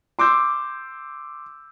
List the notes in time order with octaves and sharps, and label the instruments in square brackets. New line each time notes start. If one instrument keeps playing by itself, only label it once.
[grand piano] C6 D6 E6 G6